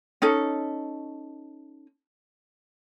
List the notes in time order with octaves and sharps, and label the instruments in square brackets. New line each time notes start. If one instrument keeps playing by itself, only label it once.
[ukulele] C#4 D#4 A4